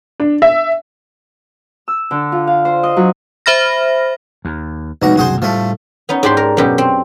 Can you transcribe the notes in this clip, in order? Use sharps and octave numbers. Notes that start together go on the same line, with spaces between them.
D4
E5
E6
D3
F4
F5
C5
D#5
F#3
C5 E5 B5 F6 A#6
D#2
F1 B1 A2 G#3 F#4 A#5
C2 F#2 B2 F#4 G#4 C5
A2 F3 G3 A3
B3 C#4 D#4
G#2 D4 G4 D5 C6
A#4
F#2 B2 G4
C4